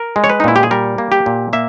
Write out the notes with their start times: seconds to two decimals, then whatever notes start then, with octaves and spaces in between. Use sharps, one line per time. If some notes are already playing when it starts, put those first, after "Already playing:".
Already playing: A#4
0.16 G#3
0.24 C#5
0.30 B4
0.40 D#4
0.44 A#2 E4
0.56 G4
0.63 G#4
0.71 G3 A#4
0.98 A#3
1.12 G4
1.26 A#2
1.53 A#3 E5